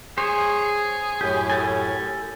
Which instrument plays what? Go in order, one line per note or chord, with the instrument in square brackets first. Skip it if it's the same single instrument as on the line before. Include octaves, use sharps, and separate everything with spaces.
[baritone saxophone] G#4 [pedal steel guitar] C5 C#5
[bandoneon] F#2 A2 C#4 [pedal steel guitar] G4
[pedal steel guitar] G4 A4 G#5